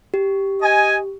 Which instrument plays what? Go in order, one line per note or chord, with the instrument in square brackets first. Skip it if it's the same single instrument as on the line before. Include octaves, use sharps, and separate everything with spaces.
[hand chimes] G4
[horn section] D#5 G#5